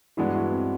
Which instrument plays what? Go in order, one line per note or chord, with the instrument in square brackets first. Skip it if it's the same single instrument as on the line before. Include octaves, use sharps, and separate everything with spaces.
[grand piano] G2 E3 G#3 B3 D4 [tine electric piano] E4 F#4
[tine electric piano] E4 F#4
C4